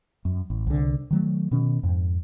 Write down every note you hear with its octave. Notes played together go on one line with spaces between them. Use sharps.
F#2
A1
C2 D3
D#3 F#3 A3
B2 D#3 C#4
F2 G#2